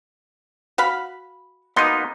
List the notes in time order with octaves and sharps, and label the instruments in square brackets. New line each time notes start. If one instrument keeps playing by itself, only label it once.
[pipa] F#4 F5 B5
[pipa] B2 C6 [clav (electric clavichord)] A#3 B3 D#4